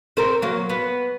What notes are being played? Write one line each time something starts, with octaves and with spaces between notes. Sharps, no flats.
C4 A4 A#4
F#3 A#3
B3